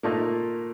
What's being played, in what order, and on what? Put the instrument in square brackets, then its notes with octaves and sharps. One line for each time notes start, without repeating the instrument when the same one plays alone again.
[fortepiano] A#2 A3 D#4 [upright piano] A#3